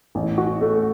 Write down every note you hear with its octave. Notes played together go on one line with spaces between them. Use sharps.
A1
F#4
A3